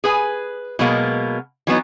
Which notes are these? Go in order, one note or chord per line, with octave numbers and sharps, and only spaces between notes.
G#4 B4 G#5
B2 F#3 G#3 A#3 B3
E3 F#3 B3 D#4